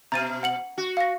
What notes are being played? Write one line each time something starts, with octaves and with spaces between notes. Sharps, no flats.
B2 A#5 A6 D#7
F#5 C#7 F#7
F#4
F5 A#6